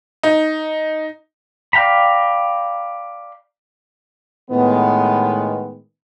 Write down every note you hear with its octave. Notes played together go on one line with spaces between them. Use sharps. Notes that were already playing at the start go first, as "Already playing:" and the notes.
D#4
D5 F5 G5 A#5 B5
A2 D#3 G#3 B3